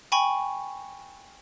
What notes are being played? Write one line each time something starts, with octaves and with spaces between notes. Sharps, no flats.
G5 G#5 B5 C#6